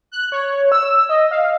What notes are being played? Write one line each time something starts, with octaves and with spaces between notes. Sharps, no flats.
F#6
C#5
E6
D#5
F5